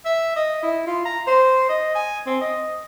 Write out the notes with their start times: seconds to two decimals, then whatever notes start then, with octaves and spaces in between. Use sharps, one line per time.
0.05 E5
0.36 D#5
0.63 E4
0.87 F4
1.05 A#5
1.27 C5
1.69 D#5
1.95 G#5
2.27 C4
2.41 D#5